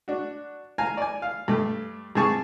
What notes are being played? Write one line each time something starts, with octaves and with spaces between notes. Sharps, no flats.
D4 F#4
F5 G#5 A#5
D5 G#5
F5
G2 A3
G2 C4 G#4 A5 C#6